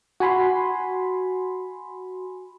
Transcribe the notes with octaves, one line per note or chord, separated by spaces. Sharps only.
F#4 G#5 B5 C6